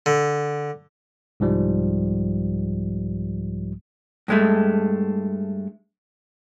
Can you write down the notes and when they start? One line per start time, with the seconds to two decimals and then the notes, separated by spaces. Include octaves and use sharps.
0.06 D3
1.40 C2 G#2 F3 G3
4.28 G2 G#3 A3